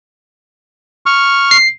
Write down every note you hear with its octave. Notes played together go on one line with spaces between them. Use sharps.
C#6 F6
C7